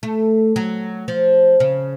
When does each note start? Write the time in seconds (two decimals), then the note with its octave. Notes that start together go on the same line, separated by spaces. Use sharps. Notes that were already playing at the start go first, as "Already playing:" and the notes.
0.03 A3
0.56 F#3
1.08 F3
1.60 C#3